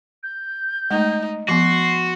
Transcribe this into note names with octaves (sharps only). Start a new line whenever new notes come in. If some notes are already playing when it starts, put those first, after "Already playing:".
G6
G#3 A3 D#4
F3 B3 F#4 C6 C7